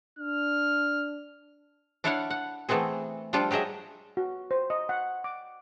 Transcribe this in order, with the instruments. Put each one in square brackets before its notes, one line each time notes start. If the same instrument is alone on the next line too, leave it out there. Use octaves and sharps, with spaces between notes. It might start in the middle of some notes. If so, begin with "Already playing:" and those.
[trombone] D4 [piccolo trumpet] F6
[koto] D4 E4 A4 C#5 F5 F#5
F#5
E3 A3 B3 C4 G#4
F3 G3 D4 F4 A4
F#3 G4 G#4 D#5 E5
[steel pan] F#4
C5
D#5
F#5
D6